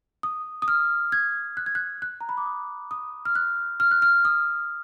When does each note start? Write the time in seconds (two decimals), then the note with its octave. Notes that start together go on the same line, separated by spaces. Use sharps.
0.23 D#6
0.62 D#6
0.68 F6
1.12 G#6
1.57 F#6
1.66 G#6
1.75 F#6
2.02 F#6
2.21 A#5
2.29 B5
2.37 D6
2.46 D#6
2.91 D#6
3.25 F6
3.35 F#6
3.80 F6
3.91 F#6
4.02 F6
4.25 D#6